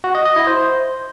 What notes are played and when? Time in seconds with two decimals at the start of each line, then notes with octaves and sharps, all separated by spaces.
0.04 F#4
0.15 D#5
0.25 D#5
0.36 E4
0.47 C5